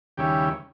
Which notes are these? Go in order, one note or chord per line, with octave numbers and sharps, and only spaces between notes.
D#2 C#3 G3 C#4 E4 G4